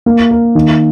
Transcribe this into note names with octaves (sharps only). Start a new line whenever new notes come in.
A#3
A#4
D#3